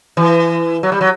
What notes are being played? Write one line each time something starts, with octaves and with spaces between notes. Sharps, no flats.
E3
F#3
G3
F#3